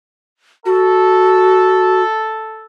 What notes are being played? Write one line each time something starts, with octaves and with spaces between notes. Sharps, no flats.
F#4 A4